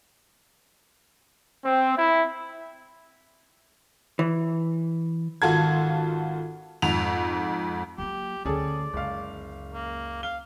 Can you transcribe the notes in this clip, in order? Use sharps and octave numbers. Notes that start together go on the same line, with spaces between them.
C4
E4
E3
G#1 F4 F#4 A4 G#6
F2 G#2 F7
F#3 A#3 G4
D2 D3 C#4 G#4 A4 D5
F#1 C#2 F5
A#3
F5 G7